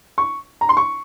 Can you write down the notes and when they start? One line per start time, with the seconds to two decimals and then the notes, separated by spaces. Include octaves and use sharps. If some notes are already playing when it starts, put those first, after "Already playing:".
0.18 C#6
0.61 A#5
0.69 C6
0.77 C#6